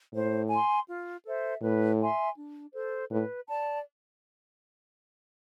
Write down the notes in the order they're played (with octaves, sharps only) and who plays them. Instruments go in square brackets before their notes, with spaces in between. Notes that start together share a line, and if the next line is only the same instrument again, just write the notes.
[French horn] A2 [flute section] C5
[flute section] G#5 C6
F4
A4 C5 E5
[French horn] A2 [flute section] B4
[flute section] E5 G#5 C6
D4
A4 C5
[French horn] A2 [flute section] B4
[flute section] D5 A5